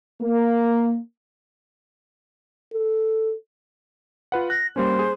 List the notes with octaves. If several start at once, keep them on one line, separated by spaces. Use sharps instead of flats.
A#3
A4
F4 B4 F#5
F#6 A#6
G3 A#3 C#4 C5
G#4